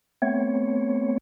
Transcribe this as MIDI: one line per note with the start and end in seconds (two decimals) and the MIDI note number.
0.22 1.18 57
0.22 1.18 59
0.22 1.18 60
0.22 1.18 73